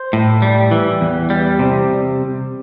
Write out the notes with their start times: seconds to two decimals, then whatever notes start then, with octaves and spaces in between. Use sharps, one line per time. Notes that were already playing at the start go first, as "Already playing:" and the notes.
Already playing: C5
0.13 A2
0.42 G3
0.71 E3
1.01 E2
1.30 G3
1.59 C3